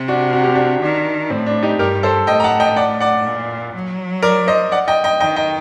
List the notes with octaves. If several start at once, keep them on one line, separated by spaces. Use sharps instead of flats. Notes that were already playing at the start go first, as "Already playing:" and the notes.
Already playing: C3
D4 F#4
F#4
G4
D4 F#4
D#3 D4
A2 C4
D4
D#4 G4
G2 G4 A#4
A4 C5
A2 D#5 G5
A#5
F#5 A5
D#5 G5
D5 F#5
D5 F#5
A#2
F#3
A#4 D5
C5 D#5
D5 F#5
D#5 G5
D#5 G5
D#3 D#5 G5
D#5 G5